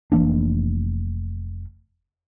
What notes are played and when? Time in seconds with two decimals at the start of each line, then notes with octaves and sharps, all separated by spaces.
0.12 F1 E3 A#3 D4